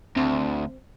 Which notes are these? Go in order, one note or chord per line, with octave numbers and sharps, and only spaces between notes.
D2 C4